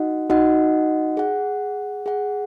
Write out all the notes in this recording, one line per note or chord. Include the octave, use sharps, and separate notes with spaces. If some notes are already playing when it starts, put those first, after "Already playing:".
Already playing: D#4 F#4 D#5 F#5
D#4 F#4 D#5 F#5
G#4 F#5
G#4 F#5